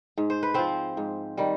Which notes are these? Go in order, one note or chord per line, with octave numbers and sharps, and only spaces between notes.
G#2
C5
B4
F3 C4 C5
G#2
D#3 G3